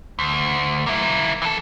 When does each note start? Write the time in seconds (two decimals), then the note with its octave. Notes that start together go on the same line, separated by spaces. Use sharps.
0.19 D2
0.87 A#3 E4
1.42 E3 A4